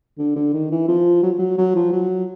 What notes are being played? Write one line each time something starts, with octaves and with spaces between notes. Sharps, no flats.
D3
D3
D#3
E3
F3
F#3
F#3
F#3
F3
F#3